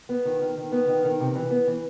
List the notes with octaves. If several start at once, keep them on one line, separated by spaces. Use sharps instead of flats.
B3
D#3
D#3
D#3
B3
D#3
D#3
C3
E3
B3
E3